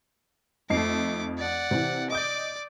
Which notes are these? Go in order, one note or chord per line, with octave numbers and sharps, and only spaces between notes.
F2 A3 D#4 D6 C7
D5 F#5
C3 E3
D5 D#5 D6 D#6 G6